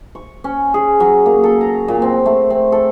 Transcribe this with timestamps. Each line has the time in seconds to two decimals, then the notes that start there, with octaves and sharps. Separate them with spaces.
0.15 C#6
0.44 C#4
0.74 G#4
1.00 F#3
1.26 A#3
1.43 A4
1.61 A#5
1.88 A#2
2.02 C4
2.26 A3
2.50 C4
2.72 A4